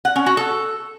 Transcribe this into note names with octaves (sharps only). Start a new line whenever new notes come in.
F#5
C#4
F#4
A4